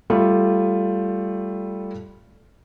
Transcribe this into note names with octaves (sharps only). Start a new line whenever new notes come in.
G3 A3 F4